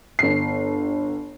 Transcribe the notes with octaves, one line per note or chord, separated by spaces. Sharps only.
G1 C7